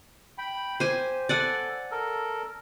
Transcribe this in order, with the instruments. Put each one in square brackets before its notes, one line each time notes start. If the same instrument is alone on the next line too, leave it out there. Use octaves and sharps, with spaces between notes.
[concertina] G5 B5
[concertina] G4 [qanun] C5 G#5
[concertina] A4 [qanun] D5 F#5 G#5
[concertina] A4 A#4